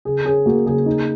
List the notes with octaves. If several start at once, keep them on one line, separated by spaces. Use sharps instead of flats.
C#3 G#4
C#4 G#4
A#3 F#4
C#3 G#4
D#4